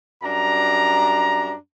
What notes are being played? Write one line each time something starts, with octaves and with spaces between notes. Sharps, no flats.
F#2 G3 D4 A#5